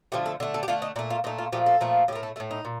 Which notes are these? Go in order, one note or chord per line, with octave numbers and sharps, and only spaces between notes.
D3 F3 A3 G4
A4
D3 A3
A4
G4
D3 A3 F4
D#4
A#2 A3 D4
F4
A#2 A3 D#4
F4
A#2 F3 A3 G4
A4
A#2 F3 A3
A2 A3 G4 A#4
A4
A2 A3 A4
D#4
A#2